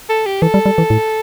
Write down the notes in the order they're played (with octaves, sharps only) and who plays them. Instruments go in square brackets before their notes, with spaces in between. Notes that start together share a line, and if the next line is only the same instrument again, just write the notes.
[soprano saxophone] A4
G4
[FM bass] E3 [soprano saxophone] A4
[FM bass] G3
G3
E3
A2